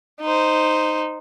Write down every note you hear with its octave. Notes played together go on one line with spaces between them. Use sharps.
D#4 C5